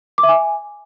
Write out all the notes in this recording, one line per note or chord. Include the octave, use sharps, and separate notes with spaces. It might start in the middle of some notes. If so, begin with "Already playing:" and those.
D6
E5
G#5